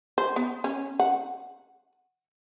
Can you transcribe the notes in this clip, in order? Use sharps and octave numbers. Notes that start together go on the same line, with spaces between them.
C5
B3
C#4
F#5